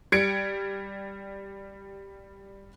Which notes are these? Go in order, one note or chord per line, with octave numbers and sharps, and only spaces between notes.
G3 G#6 C#7 D7